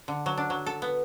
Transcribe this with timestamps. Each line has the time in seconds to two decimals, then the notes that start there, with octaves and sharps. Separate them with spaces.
0.08 D3
0.26 F#3
0.37 D4
0.50 F#3
0.66 A4
0.82 B3